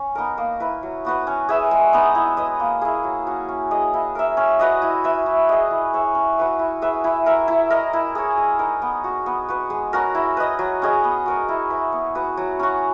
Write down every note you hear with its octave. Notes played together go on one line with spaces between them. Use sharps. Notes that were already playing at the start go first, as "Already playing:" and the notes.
Already playing: C#4
B3 D#4 A#4
A#3
E4 B4
F#3
B3 F#4 B4
C#4
G#4 B4 E5
G#3
B3 D#4
E4
B4 D#5
A#3
E4 G#4
F#3
C#4 F#4
C#4
G#4 D#5
E4
A#4 E5
C#4
F#4 B4 D#5
E4
B4 E5
E4
G#4 D#5
E4
G#4 C#5 E5
C#4
F#4 B4 E5
E4
G#4 B4 E5
E4
A#4 E5
E4
A#4 D#5
E4
G#4 C#5
G#3
D#4 A#4
B3
F#4 A#4
B3
F#4 B4
G#3
C#4 F#4 A#4
E4
B4 D#5
F#3
C#4 G#4 D#5
B3
F#4 A#4 C#5
E4
B4 E5
B3
F#4 B4
F#3
C#4 F#4